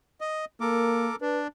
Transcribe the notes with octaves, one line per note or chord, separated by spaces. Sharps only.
D#5
A#3 A4 A#4 D6
D4 B4